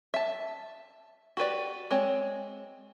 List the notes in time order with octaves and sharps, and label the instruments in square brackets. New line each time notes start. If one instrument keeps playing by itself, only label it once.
[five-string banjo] E5 A5
F#4 G4 B4 D5
G#3 C4 C#5